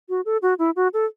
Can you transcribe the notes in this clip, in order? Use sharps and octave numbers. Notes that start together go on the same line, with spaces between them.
F#4
A4
F#4
E4
F#4
A4